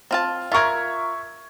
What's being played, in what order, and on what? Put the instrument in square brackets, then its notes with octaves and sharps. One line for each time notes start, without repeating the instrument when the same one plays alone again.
[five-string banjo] C4 F4 A5
[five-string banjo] F4 A#4 [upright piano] E5 C#6 G#6